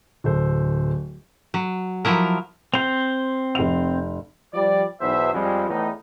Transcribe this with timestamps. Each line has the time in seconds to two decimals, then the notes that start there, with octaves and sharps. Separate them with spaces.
0.24 D1 A4 C5
1.54 F#3
2.05 F3 F#3 E4 A#4
2.74 C4 C5 F7
3.55 F1 F7
4.54 F3 G3 D5
5.01 B1 E2 C5 E5
5.34 F2 G3 G#3
5.70 E2 A2 D#4